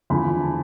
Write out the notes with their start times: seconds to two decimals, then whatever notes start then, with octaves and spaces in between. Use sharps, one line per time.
0.10 E2 D3 F3 B5
0.41 A5